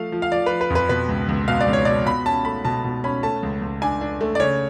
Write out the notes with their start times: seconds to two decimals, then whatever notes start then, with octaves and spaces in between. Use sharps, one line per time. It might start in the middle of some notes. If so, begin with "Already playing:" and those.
Already playing: F3 A3 F5
0.12 F3
0.22 F5
0.31 F3 D5
0.46 F3 B4
0.61 B4
0.70 F2
0.75 B4
0.89 B2 B4
1.09 C#2
1.29 C#2
1.48 B2 F5
1.61 D5
1.68 C#2
1.73 C#5
1.85 B2 D5
2.06 B2 B5
2.26 C#4 A5
2.45 A3 B5
2.65 B2 A5
2.84 B2
3.04 C#4 B5
3.23 A3 A5
3.43 C#2
3.62 C#2
3.82 D4 G#5
4.01 D4
4.21 A3
4.35 D5
4.40 C#3 C#5